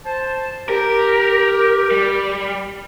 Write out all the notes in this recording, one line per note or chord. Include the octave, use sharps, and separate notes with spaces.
C5 A5
G4 A#4
G3